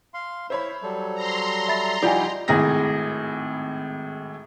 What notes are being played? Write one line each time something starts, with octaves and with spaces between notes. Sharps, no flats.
F5 C6
E4 C5 C#5 E5 B5
F#3 G3 A4
A#5 C6
E5 B5 A6
F3 G3 D#4 E4 G4 D5 F#5 G#5
G#1 A2 G#4 A#6